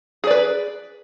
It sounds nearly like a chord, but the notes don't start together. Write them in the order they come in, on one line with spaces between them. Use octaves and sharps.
G#4 D5 B4